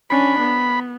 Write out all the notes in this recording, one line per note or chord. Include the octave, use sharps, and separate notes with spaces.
C#4 D4 B5
B3